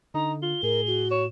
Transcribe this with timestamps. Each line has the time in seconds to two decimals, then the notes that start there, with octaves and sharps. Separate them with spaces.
0.14 D3 D#4 A#5
0.42 F4 G7
0.63 A2 G#4 A#4
0.87 F#4
1.11 C#5 E7